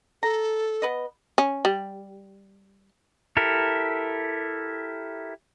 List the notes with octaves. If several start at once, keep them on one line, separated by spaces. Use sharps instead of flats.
A4 A#5
B3 B4 D#5
C#4
G3
E4 G4 A4 A#4